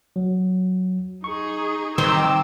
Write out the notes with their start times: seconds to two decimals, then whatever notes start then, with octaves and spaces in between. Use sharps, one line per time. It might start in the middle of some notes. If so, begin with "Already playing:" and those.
0.16 F#3
1.24 D#4 G#4 C#6
1.98 D#3 C4 D6 E6